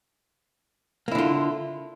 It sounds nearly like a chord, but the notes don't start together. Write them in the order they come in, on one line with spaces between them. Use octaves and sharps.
A#3 E4 D3 F4